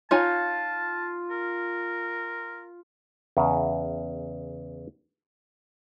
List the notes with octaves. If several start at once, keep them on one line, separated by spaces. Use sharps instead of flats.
D#4 F4 C#5 G#5 A5
A#4
E2 C#3